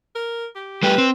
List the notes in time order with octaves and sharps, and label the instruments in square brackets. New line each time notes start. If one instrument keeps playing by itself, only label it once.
[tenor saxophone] A#4
G4
[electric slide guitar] G3 A3 G4 [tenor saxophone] B4
[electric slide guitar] C4